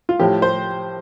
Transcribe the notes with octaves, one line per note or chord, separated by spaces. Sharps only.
F4
A2 F3 G4
C5